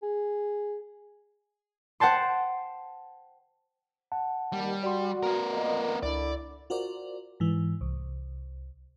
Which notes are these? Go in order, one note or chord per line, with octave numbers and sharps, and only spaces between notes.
G#4
C5 F#5 G5 A5 C6
F#5 A5
D#2 G3
F#4 D5 C6
B3 A#4
F2 A#3 D#5
C#2 D3 E4 D5
F4 F#4 A#4 C5 D5
G#2 E3
C2